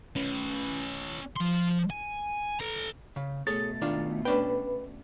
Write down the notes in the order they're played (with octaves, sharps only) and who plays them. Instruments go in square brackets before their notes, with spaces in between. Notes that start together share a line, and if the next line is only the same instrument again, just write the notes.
[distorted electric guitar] C#4 B4
F3 C6
G#5
A4 A#5
[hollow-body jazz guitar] C#3
[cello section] B2 A3 [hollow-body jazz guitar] G#4 A4 C#5 [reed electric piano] A6
[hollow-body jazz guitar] D#3 D4 F4
[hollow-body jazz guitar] C#4 D4 G5 [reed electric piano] B4